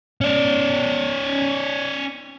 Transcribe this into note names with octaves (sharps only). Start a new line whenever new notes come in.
C#4 D5